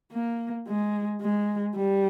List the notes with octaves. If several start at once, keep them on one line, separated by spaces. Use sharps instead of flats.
A#3
G#3
G#3
G3